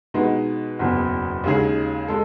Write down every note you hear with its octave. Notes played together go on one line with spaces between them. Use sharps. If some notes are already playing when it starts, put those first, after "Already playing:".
B2 G#3 B3 D#4
F#1 E2 B2
D#2 C#3 G#3 D#4 G#4
G#3 A4